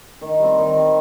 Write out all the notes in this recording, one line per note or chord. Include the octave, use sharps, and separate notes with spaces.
D#3
G3 C4
D#3
G3 C4